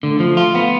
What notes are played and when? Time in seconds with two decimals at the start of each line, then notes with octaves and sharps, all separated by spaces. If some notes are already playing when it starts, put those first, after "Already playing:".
0.02 D3 A3
0.20 F3
0.37 F4
0.55 B3